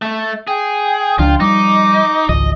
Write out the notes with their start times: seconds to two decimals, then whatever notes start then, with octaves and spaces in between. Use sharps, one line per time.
0.02 A3
0.48 G#4 G5
1.19 C#2 F3 D4 F4
1.40 F3 G3 D#4 D6
2.29 G#1 C#2 F3 D#5